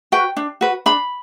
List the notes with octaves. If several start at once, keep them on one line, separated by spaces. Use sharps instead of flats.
F#4 B4 G5
D4
F#4 B4
D4 B5